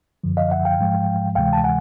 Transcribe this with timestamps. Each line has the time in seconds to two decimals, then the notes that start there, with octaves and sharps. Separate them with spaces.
0.24 F#2 D3 F3
0.37 D#5 F5
0.51 E5 F#5
0.65 F5 G5
0.80 G#2 F3 G#3
1.35 D2 C3 E3 G#3 F5 G5
1.53 A5
1.64 F#5 G#5